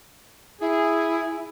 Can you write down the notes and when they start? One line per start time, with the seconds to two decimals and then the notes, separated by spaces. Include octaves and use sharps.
0.61 E4 G#4